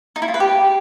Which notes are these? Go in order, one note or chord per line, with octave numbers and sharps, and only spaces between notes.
D#4
E4
F4
B4
G4